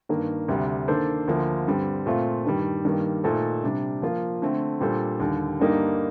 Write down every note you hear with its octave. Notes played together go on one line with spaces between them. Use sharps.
G2 D#3 A#3
D2 C3 G3
D#3 A#3 D4 A4 C5
D2 D3 F3 A#3
G2 D3 G3 C4
A#2 A3 C4 F4
G2 D#3 G3
G2 D#3 G3 A#3
A#2 A3 D#4 A4 C5
C3 G3 D4
F3 A#3 F4
D3 A3 C4
A#2 G3 D4 A4 C5
D#2 D3 G3
G2 D3 G3 A#3 D#4